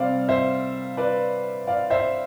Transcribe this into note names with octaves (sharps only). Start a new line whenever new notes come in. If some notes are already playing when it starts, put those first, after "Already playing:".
Already playing: C3 G3 C4 C5 D5 F5
C5 E5
B4 D5
D5 F5
C5 E5